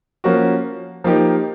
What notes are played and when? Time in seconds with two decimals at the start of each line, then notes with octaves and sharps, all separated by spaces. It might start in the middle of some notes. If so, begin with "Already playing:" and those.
0.24 F3 A#3 C#4 F#4
1.04 F3 A#3 D#4 G4